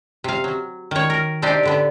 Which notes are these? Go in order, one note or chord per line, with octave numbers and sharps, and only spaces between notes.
C3 F5
F#3
D#3 C#5
A#4
C3 C4 D4 D#4 G4 D5
A2 D3 B3